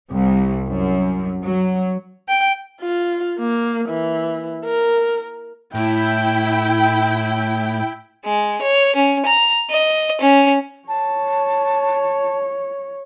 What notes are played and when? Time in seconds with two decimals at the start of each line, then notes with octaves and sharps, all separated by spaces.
0.11 C2
0.68 F#2
1.43 F#3
2.28 G5
2.81 F4
3.39 A#3
3.89 E3
4.64 A#4
5.75 A2 E4 G5
8.25 G#3
8.62 C#5
8.96 C#4
9.26 A#5
9.70 D#5
10.21 C#4
10.88 C#5 A5